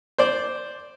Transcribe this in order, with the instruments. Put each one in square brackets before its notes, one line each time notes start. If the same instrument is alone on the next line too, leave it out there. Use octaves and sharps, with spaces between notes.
[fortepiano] C5 D5